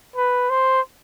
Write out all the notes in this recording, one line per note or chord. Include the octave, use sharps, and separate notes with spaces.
B4
C5